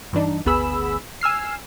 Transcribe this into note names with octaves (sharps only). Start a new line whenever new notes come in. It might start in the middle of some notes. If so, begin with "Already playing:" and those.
G2 E3 D4 D#4
G1 D2 B3 G#4 B5 E6
G#5 E6 F6 C7